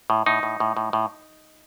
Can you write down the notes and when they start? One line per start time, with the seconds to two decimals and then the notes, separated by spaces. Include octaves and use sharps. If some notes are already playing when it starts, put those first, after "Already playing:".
0.10 A2
0.26 A2 D#4
0.43 A2
0.60 A2
0.77 A2
0.93 A2